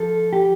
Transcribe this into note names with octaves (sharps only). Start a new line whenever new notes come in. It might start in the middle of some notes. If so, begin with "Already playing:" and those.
Already playing: F3 A4
G4